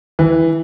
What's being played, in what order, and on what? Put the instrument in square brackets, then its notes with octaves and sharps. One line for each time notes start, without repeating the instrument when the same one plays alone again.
[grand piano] E3